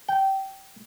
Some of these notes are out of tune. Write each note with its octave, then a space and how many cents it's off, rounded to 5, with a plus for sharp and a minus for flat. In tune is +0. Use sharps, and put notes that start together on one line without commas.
G5 -20